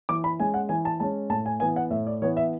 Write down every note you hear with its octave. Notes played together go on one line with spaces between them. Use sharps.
E3 D6
B5
G#3 C#4 G#5
F#5
E3 G#5
A5
G#3 C#4 A5
A2 A5
G#5
E3 B3 G#5
F#5
A2 E5
D5
E3 B3 C#5
E5